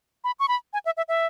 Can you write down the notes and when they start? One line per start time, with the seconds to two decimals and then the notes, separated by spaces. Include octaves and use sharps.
0.24 B5
0.39 C#6
0.48 B5
0.73 G#5
0.85 E5
0.97 E5
1.08 E5